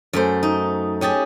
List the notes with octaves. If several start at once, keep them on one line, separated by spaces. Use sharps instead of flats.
F#2 A3 C5
D#4
C#4 G4 G#4 A5